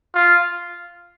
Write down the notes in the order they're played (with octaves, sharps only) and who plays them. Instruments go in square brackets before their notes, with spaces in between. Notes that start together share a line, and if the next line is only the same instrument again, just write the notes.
[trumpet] F4